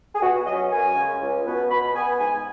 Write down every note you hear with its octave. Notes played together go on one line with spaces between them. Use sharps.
G#4
B2 F#4
F#3 C#4 D#5
F#2 G#5
C#3 G#3 C#4
C#2
B2 B3
B2 B5
B3 G#5
G#2 G#5